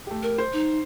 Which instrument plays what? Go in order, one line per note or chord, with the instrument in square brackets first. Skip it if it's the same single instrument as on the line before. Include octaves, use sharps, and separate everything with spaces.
[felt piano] A3 G4
[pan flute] A#4
[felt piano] C5
[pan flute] D#4